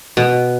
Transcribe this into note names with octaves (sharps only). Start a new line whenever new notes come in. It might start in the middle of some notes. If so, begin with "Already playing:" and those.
B2